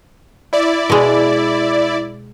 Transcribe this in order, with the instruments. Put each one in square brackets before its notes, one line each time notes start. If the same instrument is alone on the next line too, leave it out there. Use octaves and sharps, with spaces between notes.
[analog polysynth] E4 D5
[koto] B2 G#3